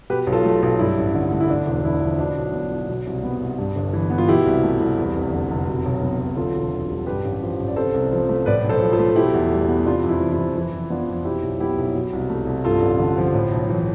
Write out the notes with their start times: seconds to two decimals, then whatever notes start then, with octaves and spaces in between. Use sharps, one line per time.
0.10 B2 G4 B4
0.27 B1
0.33 F4 A4
0.44 A3
0.62 B1
0.79 G2 E4
0.98 A1
1.15 D3
1.32 A3
1.40 E4
1.50 D2 D4
1.66 E1
1.84 D3 E4
2.01 F3
2.19 B2 D4
2.37 B1
2.53 B3
2.71 B1
2.89 B2
3.07 C2
3.23 B3
3.41 C2
3.58 G2
3.76 G1
3.93 E3
4.10 B3
4.18 F4
4.28 B2 E4 G4
4.46 C2
4.63 A3
4.81 C2
4.98 E2
5.16 F1
5.32 D3
5.51 F1
5.68 B2
5.85 B1
6.02 B3
6.20 B1
6.37 D2 F4 A4
6.54 E1
6.73 D3
6.90 G3
7.06 G2 G4 B4
7.25 A1
7.42 F3
7.60 A1
7.68 D5
7.76 C3 A4 C5
7.94 C2
8.12 F3
8.29 A3
8.46 A2 B4 D5
8.64 B1
8.69 A4 C5
8.81 F3
8.92 F4 A4
8.99 A3
9.16 B2 E4 G4
9.34 E2
9.52 G3
9.69 B3
9.85 C3 D4 F4
10.04 F2
10.09 E4
10.21 E3
10.32 E4
10.39 F2
10.56 E3 E4
10.73 F2
10.90 B3 D4 F4
11.09 F2
11.25 B2 E4 G4
11.43 B1
11.60 B3 E4 G4
11.78 B1
11.95 B2
12.13 C2
12.30 A3
12.47 C2
12.65 G2 F4 A4
12.82 A1
12.99 D3
13.17 F3
13.35 A2
13.52 B1
13.70 E3